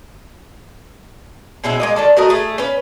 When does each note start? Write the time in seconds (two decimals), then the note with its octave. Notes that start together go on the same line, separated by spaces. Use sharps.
1.64 B2 G#3 C#4 E4
1.80 G#3 A#3 D#5
1.96 D#3 D4 A4
2.17 A3 F#4 A#4 D#5
2.29 A3 G#4
2.58 C#4 B4